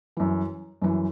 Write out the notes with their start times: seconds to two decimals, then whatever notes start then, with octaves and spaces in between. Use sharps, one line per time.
0.17 F#2 E3
0.82 F#2 E3